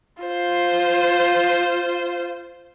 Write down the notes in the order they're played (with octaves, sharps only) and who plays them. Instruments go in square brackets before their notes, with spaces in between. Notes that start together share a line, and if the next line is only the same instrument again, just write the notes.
[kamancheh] F4 C5